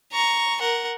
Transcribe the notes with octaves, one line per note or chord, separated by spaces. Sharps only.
A#5 C#6
A#4 F#5